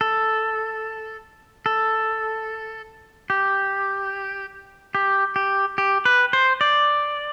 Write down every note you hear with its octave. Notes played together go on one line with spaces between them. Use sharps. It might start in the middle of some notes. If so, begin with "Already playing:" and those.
A4
A4
G4
G4
G4
G4
B4
C5
D5